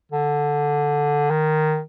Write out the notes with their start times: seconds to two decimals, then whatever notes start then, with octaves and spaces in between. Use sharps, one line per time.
0.12 D3
1.31 D#3